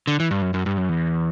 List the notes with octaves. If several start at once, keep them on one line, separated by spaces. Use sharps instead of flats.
D3
E3
G2
F#2
F#2
G2
F#2
E2